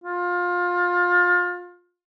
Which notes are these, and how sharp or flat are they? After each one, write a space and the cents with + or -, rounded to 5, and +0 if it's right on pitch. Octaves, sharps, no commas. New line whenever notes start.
F4 +25